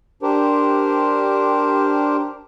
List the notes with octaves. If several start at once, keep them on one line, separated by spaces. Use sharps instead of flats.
D4 G4 A#4 C5